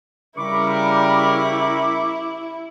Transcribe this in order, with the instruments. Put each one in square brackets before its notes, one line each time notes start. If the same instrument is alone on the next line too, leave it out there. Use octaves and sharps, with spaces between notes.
[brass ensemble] C#3 G3 A#4 [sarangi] E4 [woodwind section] B5 C#6 D6